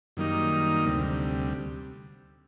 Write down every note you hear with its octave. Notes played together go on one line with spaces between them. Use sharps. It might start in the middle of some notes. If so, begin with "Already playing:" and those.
F#2 D#3 G3 A#3 D#4
D2 C3 G3